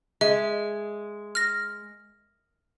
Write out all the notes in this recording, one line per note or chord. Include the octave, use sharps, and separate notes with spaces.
G#3 E5
F6 A#6